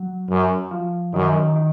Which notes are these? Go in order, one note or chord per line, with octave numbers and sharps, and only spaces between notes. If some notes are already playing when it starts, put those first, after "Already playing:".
Already playing: F#3
F#2
F3
F#2 D#3
D#3
D#3